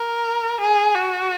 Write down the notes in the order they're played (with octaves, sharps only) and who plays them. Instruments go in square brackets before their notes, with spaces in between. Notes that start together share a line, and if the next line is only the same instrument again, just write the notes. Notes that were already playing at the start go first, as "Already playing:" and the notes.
Already playing: [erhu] A#4
G#4
F#4